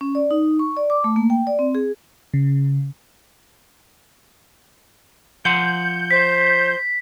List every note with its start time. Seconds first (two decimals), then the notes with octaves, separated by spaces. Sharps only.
0.01 C#4
0.15 D5
0.31 D#4
0.59 C#6
0.77 D5
0.90 D6
1.04 A3
1.16 A#3
1.30 G5
1.47 D5
1.59 C4
1.75 G#4
2.34 C#3
5.45 F3 F#5 C6 G6
6.11 C5 B6